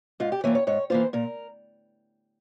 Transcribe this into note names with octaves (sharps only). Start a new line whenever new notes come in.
G#2 F4
G4
E3 A#3 F4 C#5
C#5
G#2 C#5
E3 A#3 F4 C5
A#2 A#4